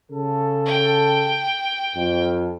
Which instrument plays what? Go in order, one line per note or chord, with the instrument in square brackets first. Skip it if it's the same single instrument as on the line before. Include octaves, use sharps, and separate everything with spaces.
[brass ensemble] C#3 A4
[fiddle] G5
[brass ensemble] F2